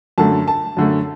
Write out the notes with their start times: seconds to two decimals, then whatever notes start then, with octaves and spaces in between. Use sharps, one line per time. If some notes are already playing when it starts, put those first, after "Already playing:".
0.18 F#2 D3 A3 A5
0.48 A5
0.77 F#2 D3 A3